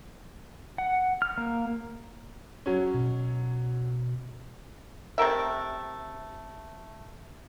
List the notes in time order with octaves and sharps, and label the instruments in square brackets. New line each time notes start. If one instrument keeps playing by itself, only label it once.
[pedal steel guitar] F#5
F6
A#3
[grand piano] F#3 C#4
[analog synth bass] B2
[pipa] C3 A3 A#4 E5